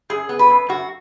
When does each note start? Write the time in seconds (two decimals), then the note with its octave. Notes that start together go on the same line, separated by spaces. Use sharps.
0.10 F#2 G#4
0.29 B3
0.39 B4
0.50 F#2
0.69 F#2 F#4